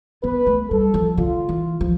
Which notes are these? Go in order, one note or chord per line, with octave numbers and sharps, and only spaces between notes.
B3 B4
A3
G3 A4
F3
D3 F4
E3
F3